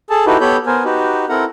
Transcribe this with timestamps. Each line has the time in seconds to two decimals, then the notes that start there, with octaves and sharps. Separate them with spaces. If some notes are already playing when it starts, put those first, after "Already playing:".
0.10 G#4 A4 A5
0.26 D#4 E4 F#4 G4 A4 B4
0.41 B3 G4 A4 C#5 B5 G6
0.67 B3 A#4 C5 G#5
0.84 D#4 F#4 G4 B4
1.29 C4 E4 A4 A#4 F#5 A#5